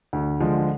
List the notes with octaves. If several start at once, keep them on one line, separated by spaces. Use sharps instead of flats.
D2
D3 F3 G#3